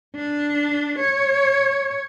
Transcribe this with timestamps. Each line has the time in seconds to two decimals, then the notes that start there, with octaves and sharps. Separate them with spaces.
0.16 D4
0.99 C#5